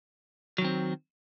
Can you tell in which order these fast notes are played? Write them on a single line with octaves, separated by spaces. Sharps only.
F#3 D#3 C4